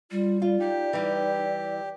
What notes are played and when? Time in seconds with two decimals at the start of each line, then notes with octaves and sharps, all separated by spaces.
0.11 G3 F4
0.42 F4 D5
0.60 D#4 G4
0.93 E3 G3